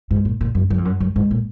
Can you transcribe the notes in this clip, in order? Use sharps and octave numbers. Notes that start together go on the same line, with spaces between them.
G#2
A#2
A#2
F#2
F#2
F2
F#2
F#2
G#2
A#2